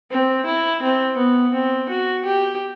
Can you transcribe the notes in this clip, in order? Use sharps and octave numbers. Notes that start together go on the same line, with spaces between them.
C4
E4
C4
B3
C4
F#4
G4